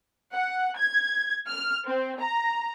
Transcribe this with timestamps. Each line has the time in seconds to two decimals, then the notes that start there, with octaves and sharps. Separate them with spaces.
0.34 F#5
0.78 G#6
1.48 F6
1.86 C4
2.21 A#5